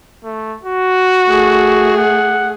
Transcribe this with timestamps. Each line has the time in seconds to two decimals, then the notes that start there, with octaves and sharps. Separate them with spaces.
0.24 A3
0.64 F#4
1.28 A3 G#4
1.97 F#5